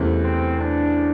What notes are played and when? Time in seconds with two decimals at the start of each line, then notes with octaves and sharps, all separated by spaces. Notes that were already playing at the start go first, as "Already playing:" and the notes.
Already playing: E2 C3 E3 A3 C#4
0.24 C4
0.60 D4